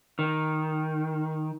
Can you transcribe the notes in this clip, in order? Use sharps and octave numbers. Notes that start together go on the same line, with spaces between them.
D#3